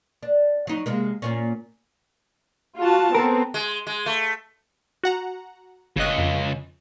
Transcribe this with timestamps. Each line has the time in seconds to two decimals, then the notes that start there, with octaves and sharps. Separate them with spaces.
0.23 D4
0.67 F#3 D#4
0.86 C3 G#3 A#3
1.22 A#2 C#4
2.78 F4 F#4 A5
3.15 B3 C4 A4 A#4
3.54 G#3
3.87 G#3
4.06 A3
5.04 F#4 F#5 A#5
5.96 G1 C#3 D#5 F#6
6.18 F2